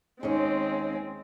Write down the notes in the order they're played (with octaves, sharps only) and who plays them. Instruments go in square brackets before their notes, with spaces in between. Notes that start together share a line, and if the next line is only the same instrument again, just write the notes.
[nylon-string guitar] D#2 C#4 [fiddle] G#3 [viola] C4